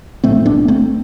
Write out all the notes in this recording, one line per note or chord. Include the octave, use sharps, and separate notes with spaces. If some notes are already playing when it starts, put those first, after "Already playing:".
B1 A2 A3 C4
B3 D4
A3 C4